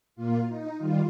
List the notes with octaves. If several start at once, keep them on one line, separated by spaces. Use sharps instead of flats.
A#2 A#3 F4
D#4
D#3 G3 F4